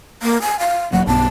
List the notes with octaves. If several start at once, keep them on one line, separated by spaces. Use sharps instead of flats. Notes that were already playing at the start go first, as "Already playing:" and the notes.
A#3
G#5
F5
D#1 F#3 A#3 F#5
B1 G2 B3 A5